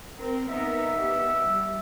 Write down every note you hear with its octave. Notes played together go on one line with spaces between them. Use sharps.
C4 A#4
B3 D#4 A#4 E5
B3 G4
G3